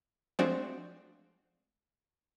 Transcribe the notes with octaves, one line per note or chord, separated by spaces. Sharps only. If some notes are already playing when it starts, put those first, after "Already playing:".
F3 G#3 A3 C4 D4 F#4